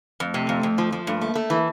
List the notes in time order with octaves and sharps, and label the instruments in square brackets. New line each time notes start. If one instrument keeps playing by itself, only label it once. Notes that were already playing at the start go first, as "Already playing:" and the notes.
[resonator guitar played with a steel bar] F2 [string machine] A3
[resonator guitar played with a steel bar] C3
F2
F2
F3
F3
[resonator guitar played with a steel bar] G2 [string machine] A#3
[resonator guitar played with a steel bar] A3
A3
E3